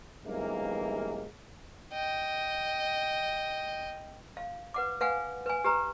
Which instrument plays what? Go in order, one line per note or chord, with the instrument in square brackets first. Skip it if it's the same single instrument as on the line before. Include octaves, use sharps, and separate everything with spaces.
[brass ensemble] B1 G2 C3 E3 G#3 A#3
[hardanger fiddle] D#5 G5
[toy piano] F5
B4 F#5 D6
B4 F5 F#5 G#5
B4 G#5
G4 B4 A#5